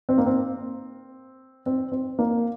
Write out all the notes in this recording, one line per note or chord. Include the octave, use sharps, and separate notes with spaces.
C4
A#3
C4
C4
C4
A#3